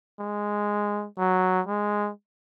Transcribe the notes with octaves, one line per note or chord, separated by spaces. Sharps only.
G#3
F#3
G#3